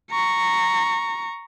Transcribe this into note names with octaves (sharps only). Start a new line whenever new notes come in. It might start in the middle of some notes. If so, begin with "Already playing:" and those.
A#5 C#6